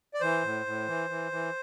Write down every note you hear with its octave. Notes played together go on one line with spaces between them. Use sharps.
D5
E3 C5
A2
A2
E3
E3
E3